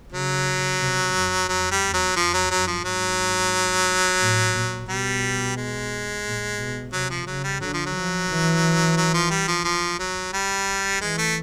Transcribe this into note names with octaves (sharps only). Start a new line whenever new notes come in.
C#3 F#3
C3
F#2
F2 F#3
G3
E2
F#3
F2 F3
F#3
F#2 F#3
F3
G#2 F#3
A2
A#2
B2 G3
G#3
A#2
B2
C3 F#3
F3
C#3 F#3
G3
D3 F#3
F3
F#3
F3
E3
F#3
F3
G3
F3
F3
F#3
G3
E3 G#3
A3